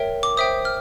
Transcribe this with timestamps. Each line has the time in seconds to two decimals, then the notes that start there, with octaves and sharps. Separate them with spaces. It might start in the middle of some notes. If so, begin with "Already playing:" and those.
Already playing: A#4 C#5 E5 G5
0.23 D6
0.37 C5 E5 G5 D#6
0.65 F6